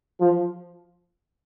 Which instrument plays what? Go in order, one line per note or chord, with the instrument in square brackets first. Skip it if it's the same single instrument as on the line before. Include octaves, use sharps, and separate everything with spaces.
[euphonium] F3